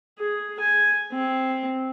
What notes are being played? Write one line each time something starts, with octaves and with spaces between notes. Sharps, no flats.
G#4
G#5
C4